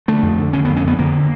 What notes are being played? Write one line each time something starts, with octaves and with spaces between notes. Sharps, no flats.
D3 A3
F2
D3
D3 C#4
F2 B3
C#4
F2 B3
D3 A#3